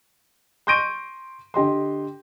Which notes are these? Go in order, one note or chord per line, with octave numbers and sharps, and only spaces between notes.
C6 C#6 G6 A#6 D7 D#7
D3 G4 D#5 C6